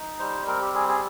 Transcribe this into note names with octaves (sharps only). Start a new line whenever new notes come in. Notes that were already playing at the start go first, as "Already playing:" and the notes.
Already playing: D#4
G3 C5
C4 A#4
G4
G3 G#4
G#4